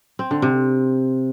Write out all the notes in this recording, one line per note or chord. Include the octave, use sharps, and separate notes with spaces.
C4
D3
C3